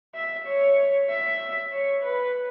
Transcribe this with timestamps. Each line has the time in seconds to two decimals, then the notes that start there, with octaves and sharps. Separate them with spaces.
0.15 E5
0.47 C#5
1.09 E5
1.72 C#5
2.04 B4